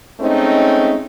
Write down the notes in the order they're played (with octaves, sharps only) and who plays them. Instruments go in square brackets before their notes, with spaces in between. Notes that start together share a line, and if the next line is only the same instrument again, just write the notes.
[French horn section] G#3 A3 C4 C#4 D#4